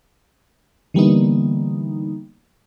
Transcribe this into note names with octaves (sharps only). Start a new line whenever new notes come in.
D3 E3 G3 A#3 B3 D#4